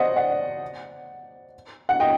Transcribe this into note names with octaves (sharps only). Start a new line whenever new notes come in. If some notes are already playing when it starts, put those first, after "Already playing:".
Already playing: C5 D5 D#5 F#5
D5 F#5
F#5
D#5 G5